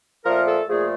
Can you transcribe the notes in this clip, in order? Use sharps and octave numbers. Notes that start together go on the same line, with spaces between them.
A#2 F3 A3 A#4
A4
A#2 F3 A3 G#4